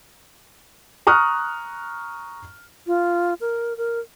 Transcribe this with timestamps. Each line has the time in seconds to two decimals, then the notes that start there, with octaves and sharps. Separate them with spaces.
1.07 A#5 C#6 D#6 F6 F#6
2.87 F4
3.41 A#4
3.77 A#4